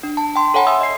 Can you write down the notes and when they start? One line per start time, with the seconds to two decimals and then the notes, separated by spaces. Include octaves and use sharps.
0.03 D4
0.17 A5
0.36 G5 C6
0.54 A4 C#5 F#5 G#5 A#5 B5
0.67 E5 F#5 G#5 C6 D#6 E6
0.81 D#5 C7